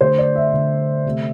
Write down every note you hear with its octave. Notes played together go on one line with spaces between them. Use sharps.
D3 A3 C5
D5
E5
D3 A3
C3 A3